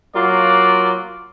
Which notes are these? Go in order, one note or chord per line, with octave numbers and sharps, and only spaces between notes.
F#3 A#3 F4 D5